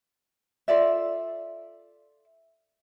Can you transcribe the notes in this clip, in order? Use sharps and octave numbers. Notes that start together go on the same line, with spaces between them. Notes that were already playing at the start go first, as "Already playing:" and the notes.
F4 A4 D5 E5